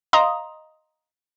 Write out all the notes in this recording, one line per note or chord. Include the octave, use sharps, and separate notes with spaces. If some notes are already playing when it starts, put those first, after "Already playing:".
D#5 F5 A#5 C6 D#6